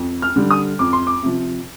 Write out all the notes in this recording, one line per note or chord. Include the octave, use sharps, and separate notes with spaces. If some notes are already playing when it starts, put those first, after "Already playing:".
Already playing: F2
F6
D3 G3
D#6
F2 D6
C6
D6
C3 F3